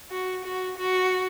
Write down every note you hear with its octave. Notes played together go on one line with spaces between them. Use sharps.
F#4
F#4
F#4